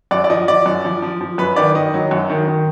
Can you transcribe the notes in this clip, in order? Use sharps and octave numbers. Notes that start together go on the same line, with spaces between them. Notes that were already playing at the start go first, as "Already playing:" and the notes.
F#2 D5
D5
F3 D#5
F3 D5
F#2
F3
F3
F3
F#2 B4
D#3 D5
D#3 D#5
F#3
F#2
D#3
D#3